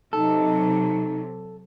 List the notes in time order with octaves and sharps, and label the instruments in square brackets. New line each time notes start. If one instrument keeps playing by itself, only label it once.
[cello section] C3 F#3 [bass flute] D#4 [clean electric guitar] A4